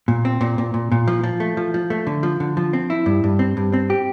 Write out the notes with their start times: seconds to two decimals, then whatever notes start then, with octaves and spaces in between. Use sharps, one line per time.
0.08 A#2
0.25 C4
0.41 A#2
0.58 A#2
0.74 A#2
0.92 A#2
1.08 F3
1.24 F3
1.40 A3
1.57 F3
1.74 F3
1.90 A3
2.07 D3
2.23 F3
2.40 D3
2.57 F3
2.73 C4
2.90 E4
3.06 G2
3.24 G2
3.39 C4
3.57 G2
3.73 C4
3.90 G4